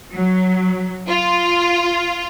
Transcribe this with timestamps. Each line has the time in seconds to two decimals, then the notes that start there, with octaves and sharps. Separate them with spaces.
0.13 F#3
1.08 F4